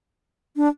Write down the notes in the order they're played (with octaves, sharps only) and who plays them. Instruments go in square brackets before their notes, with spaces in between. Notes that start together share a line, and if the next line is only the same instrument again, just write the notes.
[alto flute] D4